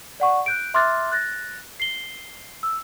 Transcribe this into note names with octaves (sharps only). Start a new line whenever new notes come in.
D5 F#5 C#6
F#6 G6 D7
E5 C6 D6 F6 F#6 A6
F#6 A6 A#6
C7 G7
E6